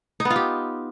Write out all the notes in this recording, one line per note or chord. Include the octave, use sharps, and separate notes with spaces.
D#4
B3
F4
G4